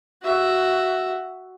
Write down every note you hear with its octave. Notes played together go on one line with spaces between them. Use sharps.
F#4 E5